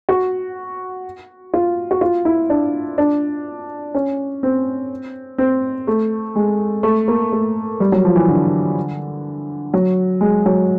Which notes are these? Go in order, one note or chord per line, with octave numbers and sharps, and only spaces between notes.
F#4
F4
F#4
F4
E4
D4
D4
C#4
C4
C4
A3
G#3
A3
A#3
A3
G3
F#3
F3
E3
D3
F#3
G#3
F#3